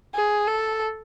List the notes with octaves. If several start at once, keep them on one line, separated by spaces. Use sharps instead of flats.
G#4
A4